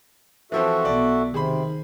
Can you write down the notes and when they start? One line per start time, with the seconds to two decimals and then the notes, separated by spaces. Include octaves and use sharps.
0.52 E3 F3 C4 F#4 A4 E5
0.85 B1 B3 E4 D5
1.34 C3 D#3 G#4 C5 B5